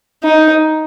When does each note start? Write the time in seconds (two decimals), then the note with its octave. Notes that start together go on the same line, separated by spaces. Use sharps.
0.23 D#4